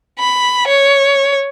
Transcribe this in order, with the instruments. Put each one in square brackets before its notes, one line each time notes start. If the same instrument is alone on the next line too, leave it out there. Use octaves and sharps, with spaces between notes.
[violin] B5
C#5